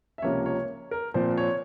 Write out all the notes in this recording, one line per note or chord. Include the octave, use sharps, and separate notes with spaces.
E5
C#2 C3 F3 A#3 C#4 C#5
C#5
A#4
A#2 F3 C4 C5
C#5